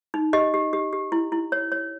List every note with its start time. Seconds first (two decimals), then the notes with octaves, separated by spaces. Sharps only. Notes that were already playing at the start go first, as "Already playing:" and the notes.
0.14 D#4
0.33 G4 D#5
0.54 G4
0.73 G4
0.93 G4
1.12 E4
1.32 E4
1.52 C#5
1.72 C#5